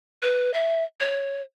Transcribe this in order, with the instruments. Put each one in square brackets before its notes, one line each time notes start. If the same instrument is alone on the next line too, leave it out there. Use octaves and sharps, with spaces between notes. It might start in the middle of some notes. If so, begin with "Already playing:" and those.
[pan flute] B4
E5
C#5